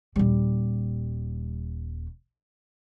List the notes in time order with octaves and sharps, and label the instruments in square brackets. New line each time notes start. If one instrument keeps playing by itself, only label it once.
[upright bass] D#1 G3